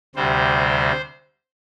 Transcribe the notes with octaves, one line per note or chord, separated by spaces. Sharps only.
D2 C3 G3 C5